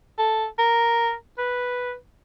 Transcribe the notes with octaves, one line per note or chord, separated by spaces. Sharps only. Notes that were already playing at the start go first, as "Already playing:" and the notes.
A4
A#4
B4